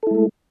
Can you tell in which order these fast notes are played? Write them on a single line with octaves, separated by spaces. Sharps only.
A4 E4 G#3 A3